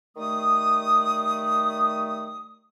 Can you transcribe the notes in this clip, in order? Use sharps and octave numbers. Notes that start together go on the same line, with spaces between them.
D#3 G3 A3 D#6